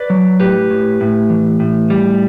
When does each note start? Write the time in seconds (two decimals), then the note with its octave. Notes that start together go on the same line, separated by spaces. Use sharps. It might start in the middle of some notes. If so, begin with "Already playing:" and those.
Already playing: B4 D5
0.10 F#3
0.40 A2 G4 B4
0.70 A2
1.01 A2
1.30 E3
1.60 A2
1.90 G3